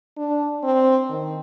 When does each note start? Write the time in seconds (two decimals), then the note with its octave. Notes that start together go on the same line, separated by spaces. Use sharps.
0.17 D4
0.64 C4
1.09 D#3